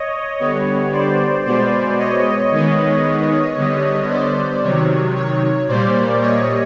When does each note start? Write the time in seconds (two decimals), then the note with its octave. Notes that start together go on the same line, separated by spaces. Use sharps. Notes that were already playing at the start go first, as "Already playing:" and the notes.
Already playing: C#5 D#5
0.40 D3 G3 B3 C#5
0.92 C5 D5
1.45 B2 G#3 B3 C5 D5
1.98 C#5 D#5
2.52 D#3 G#3 B3
3.56 D3 G3 B3
4.10 C5 D5
4.62 C3 D#3 F#3 C#5
5.16 C#5
5.68 A#2 G3 A#3 C5 D5
6.21 C#5 D#5